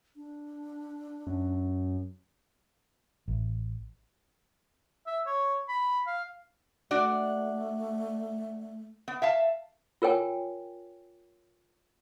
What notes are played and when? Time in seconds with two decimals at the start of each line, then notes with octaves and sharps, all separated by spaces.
0.16 D4
1.27 F#2
3.28 A1
5.07 E5
5.26 C#5
5.69 B5
6.07 F5
6.91 A3 D4 F#4 D5
9.08 B3
9.22 E5 F5 A5
10.02 F4 A#4 C#5 G5 G#5